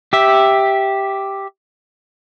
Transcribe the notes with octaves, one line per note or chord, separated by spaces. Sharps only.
G4 E5